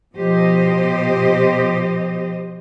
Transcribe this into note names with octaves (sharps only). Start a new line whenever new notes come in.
B2 F3 G4 C5 D#5